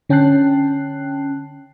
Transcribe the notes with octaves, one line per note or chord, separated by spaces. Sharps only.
D3 C#4 G5 A5 F#6 C7